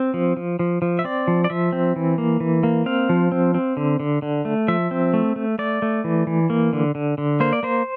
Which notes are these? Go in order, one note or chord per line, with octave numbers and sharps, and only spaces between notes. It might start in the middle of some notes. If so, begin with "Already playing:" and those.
Already playing: C4
F3
F3
F3
F3
E5
C4 D5
F3
D5
F3 E5
C4
E3
A#3
E3
A#3
C4 F5
F3
C4
C4
D3
D3
D3
A3
F3 E5
C4
A3
A3
A3 D5
A3
E3
E3
A#3
D3
D3
D3
A#3 C5
D5
A#3 C5